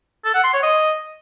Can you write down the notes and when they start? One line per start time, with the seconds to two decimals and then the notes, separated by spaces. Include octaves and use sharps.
0.25 A4
0.34 F#5
0.44 C6
0.53 C#5
0.63 D#5